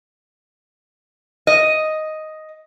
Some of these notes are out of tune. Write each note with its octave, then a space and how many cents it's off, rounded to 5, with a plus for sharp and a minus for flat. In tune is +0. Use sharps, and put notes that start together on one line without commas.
D#5 +5